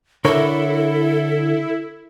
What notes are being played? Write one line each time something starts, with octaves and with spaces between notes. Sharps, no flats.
D3 E4 A4 A#4 C#5